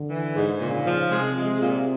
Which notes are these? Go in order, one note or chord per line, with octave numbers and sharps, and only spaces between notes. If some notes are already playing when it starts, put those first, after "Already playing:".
Already playing: D3
E3
G#2
A#2 C#3
F3
C3 G#3
G#3
A#2